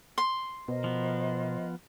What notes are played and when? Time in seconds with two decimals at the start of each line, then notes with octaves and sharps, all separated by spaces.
0.18 C6
0.68 B2 A#4 C5 D#5
0.84 F3 B3